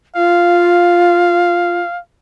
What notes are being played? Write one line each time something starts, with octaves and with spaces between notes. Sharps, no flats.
F4 F5